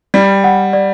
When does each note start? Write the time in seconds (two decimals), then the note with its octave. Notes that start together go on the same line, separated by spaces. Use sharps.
0.14 G3 D5
0.44 F#5
0.73 D5